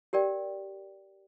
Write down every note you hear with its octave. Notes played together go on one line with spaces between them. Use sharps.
G4 A#4 D5 G5